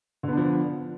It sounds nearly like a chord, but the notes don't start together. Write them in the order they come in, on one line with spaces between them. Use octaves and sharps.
D3 B3 D4 F3